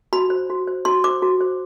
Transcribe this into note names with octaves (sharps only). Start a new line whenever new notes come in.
F#4 B5
C5
F#4
C5
F#4 C6
C5 D6
F#4
C5